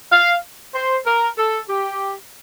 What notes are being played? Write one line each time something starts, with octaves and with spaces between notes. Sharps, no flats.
F5
C5
A#4
A4
G4